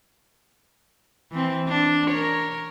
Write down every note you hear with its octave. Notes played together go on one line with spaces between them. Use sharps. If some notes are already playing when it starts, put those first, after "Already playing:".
E3 C4
D4
A#4 C#5